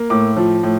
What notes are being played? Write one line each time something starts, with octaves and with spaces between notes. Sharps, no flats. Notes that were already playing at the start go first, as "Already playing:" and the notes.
Already playing: A#3
A2 D6
F3
A2